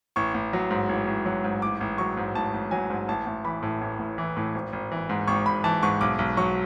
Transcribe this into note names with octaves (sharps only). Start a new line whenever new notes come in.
A1 C#6
A1
F#3
G#2
A1
A1
F#3
G#2
A1 D6
A1
F#3 C#6
G#2
A1 A5
A1
F#3 G#5
G#2
A1 A5
A1
E3 B5
A2
A1
A1
E3
A2
G#1
G#1
E3
G#2
G#1 C#6
G#1 B5
E3 A5
G#2 C#6
B1 D6
B1
F#3 C#6